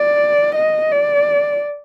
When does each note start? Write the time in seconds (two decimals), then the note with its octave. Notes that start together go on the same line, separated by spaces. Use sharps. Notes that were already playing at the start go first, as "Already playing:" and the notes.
Already playing: D5
0.55 D#5
0.91 D5